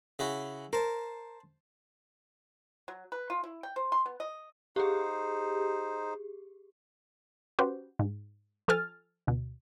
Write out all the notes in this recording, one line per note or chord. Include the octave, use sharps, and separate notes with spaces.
C#3 E4 F#4
A#4 C5 A5
F#3
B4
F4
E4
G5
C5
C6
B3
D#5
D#4 G4 G#4 C5
C#4 F#4 G4 B4 C5
G#2
F3 A4 G#5 F6 A6
D2 B2